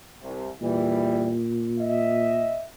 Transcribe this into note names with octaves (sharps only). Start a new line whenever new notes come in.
C2 C3
E2 A#2 E3 G3
D#5 E5